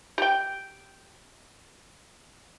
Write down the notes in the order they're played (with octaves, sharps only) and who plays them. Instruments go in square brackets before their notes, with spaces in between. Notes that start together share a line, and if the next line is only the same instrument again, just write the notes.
[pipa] G4 G5